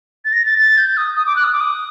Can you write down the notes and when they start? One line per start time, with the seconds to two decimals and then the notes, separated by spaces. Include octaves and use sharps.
0.25 A6
0.33 A#6
0.46 A6
0.59 A6
0.78 G6
0.97 D#6
1.16 D#6
1.26 D6
1.36 F#6
1.44 D#6
1.52 D6
1.61 D#6